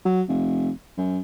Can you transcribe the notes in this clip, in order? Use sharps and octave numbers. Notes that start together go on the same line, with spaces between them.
F#3
F1
F#2